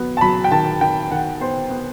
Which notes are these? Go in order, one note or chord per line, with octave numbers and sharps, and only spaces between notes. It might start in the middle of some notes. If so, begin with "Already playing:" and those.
Already playing: F#3 B3
A5
F#3 B5
G5
D#3 A5
D#3 G5
D#3 F#5
B3 C5
B3